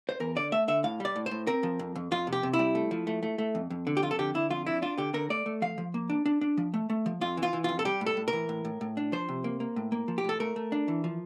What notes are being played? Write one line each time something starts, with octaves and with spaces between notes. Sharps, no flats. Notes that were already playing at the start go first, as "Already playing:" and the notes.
C5
E2 A#4
D3 D5
A3 E5
D3 E5
A2 F5
G3 D5
A2
C5
A2
C4 A#4
F3
F2
F2
F2 F4
C3
G4
C3
E4
G3
A3
F3
A3
A3
A3
F2
F2
D3
G4
F2 F4
A4
D3 G4
D3 E4
F2 F4
D4 E4
D4 F4
D3 G4
D3 A#4
A3 D5
A3
F3 F5
F3
A#3
D4
D4
D4
F3
A3
A3
F3
F2 F4
E3
F4
E3
F2 F4
A4
G3 G4
A2
A4
A2
A#4
E3
A2
A2
A2
D4
F3 C5
C3
A#3
A#3
A2
A#3
F3
G4
A2 A4
A3 A#4
A3
D4
E3
F3